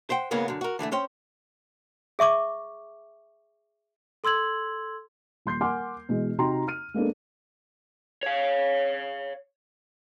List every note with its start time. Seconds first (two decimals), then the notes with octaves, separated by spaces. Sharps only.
0.10 C5 F#5 G5
0.31 G#2 C#3 F#3 A#3 B3
0.48 F#2 D3
0.61 F#4 A#4
0.79 D3 E3 G#3 A3
0.92 C#4 C5 G5
2.19 G#4 E5 C#6 D6
4.24 A4 C6 E6 G#6 F#7
5.46 D#1 C6 G6 C7
5.61 A#4 F#5 G#5 C6 D6 F6
6.09 B2 E3 G#3
6.38 C3 D#4 F#4 G5 A#5 C6
6.68 F6 D#7
6.94 G#3 A#3 B3 D4 A4
8.23 C#5 F5